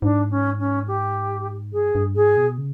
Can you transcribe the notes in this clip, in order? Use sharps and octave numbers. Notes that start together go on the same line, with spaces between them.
G#2 D4
C#4
C#4
G4
G2 G#4
G2
G#2 G#4
B2
C#3